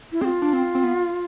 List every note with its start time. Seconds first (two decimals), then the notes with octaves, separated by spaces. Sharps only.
0.12 E4
0.21 C4 G#4
0.25 F4
0.42 D4
0.53 C4
0.75 C4
0.83 B3